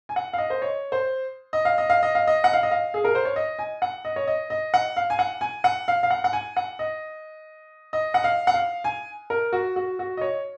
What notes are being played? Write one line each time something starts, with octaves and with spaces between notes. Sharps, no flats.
G#5
F#5
F5
D#5
C5
C#5
C5
D#5
F5
D#5
F5
D#5
F5
D#5
F#5
F5
D#5
F5
G#4
A#4
C5
C#5
D#5
G#5
F#5
D#5
C#5
D#5
D#5
F#5
F5
G#5
F#5
G#5
F#5
F5
F5
F#5
F#5
G#5
F#5
D#5
D#5
F#5
F5
F#5
F5
G#5
A#4
F#4
F#4
F#4
D#5
C#5